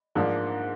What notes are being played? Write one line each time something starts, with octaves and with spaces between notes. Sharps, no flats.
G#2 F3 A#3 D4